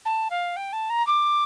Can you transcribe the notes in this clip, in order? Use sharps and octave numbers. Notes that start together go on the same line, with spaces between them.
A5
F5
G5
A5
A#5
D6